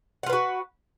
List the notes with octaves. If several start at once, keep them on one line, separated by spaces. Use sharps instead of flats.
F4 F#4 B4 F#5